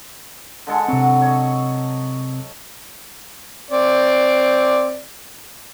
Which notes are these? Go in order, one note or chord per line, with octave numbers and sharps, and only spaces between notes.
D3 G#3 A4
C3 F#3 C4
C#5 D#5
C4 D5